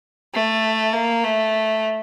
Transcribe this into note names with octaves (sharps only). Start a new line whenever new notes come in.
A3
A#3
A3